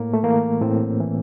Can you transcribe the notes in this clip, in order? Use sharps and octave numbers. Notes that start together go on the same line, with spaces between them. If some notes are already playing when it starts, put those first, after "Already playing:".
Already playing: A2 A#3
A3
E3 A#3
A2 C4
E3